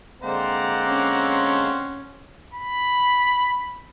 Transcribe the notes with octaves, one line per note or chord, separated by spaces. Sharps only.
D3 G#3 A#3 C4 C5 D5 F#5 A#5
C#4
B5